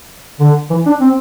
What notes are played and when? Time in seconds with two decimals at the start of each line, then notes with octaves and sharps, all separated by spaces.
0.40 D3
0.70 E3
0.86 D4
1.00 C4